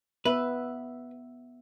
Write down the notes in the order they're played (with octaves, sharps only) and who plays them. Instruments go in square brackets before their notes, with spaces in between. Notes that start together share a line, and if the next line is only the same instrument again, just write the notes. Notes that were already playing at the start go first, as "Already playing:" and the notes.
[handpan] B3 E5 [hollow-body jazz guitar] B4